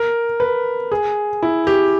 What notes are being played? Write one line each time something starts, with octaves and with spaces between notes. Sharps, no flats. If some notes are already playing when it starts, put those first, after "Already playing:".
Already playing: A#4
B4
G#4
E4
G4